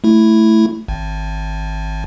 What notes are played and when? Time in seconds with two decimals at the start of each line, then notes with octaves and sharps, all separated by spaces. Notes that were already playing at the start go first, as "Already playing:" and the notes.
0.04 A3 E4
0.88 G#1